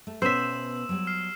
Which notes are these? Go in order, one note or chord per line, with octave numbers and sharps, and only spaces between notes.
A3
B2 B3 C#4 C5 E5 E6 E7
F#3 G3
F6 C7